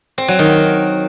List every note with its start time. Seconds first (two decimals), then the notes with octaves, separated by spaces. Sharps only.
0.18 C4
0.28 F#3
0.39 D#3